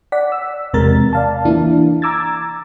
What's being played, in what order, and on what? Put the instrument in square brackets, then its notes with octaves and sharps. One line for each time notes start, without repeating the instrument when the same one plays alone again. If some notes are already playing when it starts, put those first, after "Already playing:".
[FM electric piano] D5 F#5 B6
E6
E2 C3 G#3 A#4 A6
D5 F5 A5
E3 A#3 D4 E4
A#5 D6 E6 G#6 A6